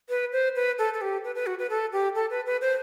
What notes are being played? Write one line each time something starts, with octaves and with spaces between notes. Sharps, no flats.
B4
C5
B4
A4
A4
G4
B4
B4
F#4
B4
A4
G4
A4
B4
B4
C5